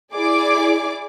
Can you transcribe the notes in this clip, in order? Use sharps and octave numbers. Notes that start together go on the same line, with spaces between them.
E4 G#4 D5 D6